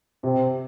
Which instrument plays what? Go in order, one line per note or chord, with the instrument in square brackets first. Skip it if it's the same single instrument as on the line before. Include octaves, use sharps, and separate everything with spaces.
[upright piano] C3 [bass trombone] C4